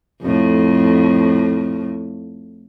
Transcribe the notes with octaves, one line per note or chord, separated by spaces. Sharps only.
F2 A2